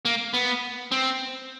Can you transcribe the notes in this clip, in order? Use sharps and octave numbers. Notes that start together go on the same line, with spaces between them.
A#3
B3
C4